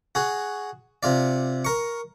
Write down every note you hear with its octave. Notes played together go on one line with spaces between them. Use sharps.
F#4 G#4
C3 F4 D5
A#4 C#6